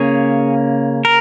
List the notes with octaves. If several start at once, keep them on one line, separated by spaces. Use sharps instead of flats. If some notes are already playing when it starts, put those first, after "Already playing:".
Already playing: C#3 A#3 C#4 G#4 C#5
A#4